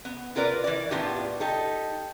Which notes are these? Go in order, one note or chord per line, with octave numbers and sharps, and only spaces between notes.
B3
F4 A#4 B4 D5
E3 D5
A2 B3 D4 D#4 F4 G4
D#4 G4 A4